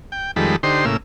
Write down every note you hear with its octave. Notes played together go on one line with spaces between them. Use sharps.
G5
F2 D#3 G3 G#3 A4 B5
D3 D#4 G4 C5 C6
A2 C#3 A#3 E6